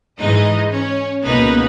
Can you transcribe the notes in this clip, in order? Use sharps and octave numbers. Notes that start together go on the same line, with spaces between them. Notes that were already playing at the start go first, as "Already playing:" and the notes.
G#2 E3 G#3 D#4 D#5
C#4 C#5
C#2 B2 A#3 B3 D#4 B4